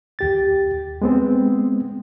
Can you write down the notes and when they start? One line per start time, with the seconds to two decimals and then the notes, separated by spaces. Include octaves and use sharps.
0.19 D#2 G4 A6
1.02 G#3 B3 C4